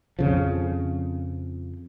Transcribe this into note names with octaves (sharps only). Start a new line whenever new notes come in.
F2 C#3 F3